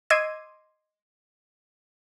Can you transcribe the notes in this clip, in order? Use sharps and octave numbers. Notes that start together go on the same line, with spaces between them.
D#5 C6 D6 E6 G#6 D#7